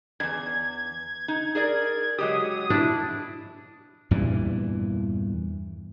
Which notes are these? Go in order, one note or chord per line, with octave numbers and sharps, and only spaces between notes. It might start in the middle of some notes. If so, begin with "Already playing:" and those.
E2 G2 G#6
D#4
G#4 A#4 D5
F#3 G#3 G4 D#6
D4 E4
E2 G2 A#2 E3